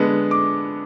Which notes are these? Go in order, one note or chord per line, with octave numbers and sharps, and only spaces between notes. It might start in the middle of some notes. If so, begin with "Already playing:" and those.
Already playing: D3 G#3 B3
D6